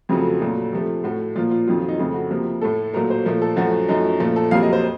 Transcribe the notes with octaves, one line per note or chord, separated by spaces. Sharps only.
F2 C#3 F#3 A3 F4
A#2 F#3 A3
C3 F3 A3
A2 A3 F#4
A#2 F3 A#3 F4
F4
F2 D#3 F#3 F4
F4
D#4
F2 C#3 A3 F4
F#4
C3 F3 A#3
A2 A3 A4
A#2 F#3 A3 A#4
C5
A#2 F3 A3 A#4
A4
F#2 F3 A3 F#4
F#2 F3 A3 D#4
A#2 F3 A3 F4
A4
F2 C3 F#3 A#3 F5
D#5
C5